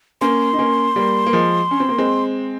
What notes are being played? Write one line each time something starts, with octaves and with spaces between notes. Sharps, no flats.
A#3 C#4 C6
D#4
A#3 C#4
G3 A#3
A#3
F3 G#3
C#4
C4
A#3
G#3 C4